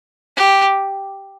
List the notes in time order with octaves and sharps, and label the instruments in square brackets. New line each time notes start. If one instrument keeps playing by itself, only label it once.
[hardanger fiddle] G4